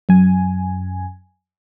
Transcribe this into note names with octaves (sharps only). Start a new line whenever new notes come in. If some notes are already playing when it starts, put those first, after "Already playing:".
F#2 G#5